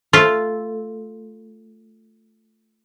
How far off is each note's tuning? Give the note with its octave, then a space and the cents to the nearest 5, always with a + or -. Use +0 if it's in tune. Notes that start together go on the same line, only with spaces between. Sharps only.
A3 +0 F4 +0